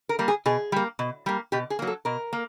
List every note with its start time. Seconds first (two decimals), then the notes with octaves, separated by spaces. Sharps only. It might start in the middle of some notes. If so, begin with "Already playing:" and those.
0.09 A#4
0.19 G3 A#3
0.28 G#4
0.46 B2 G#4
0.72 G3 A#3
0.99 B2
1.26 G3 A#3
1.52 B2 G4
1.70 G#4
1.79 F#3 A#3
1.87 A4
2.05 B2 A#4
2.33 A#3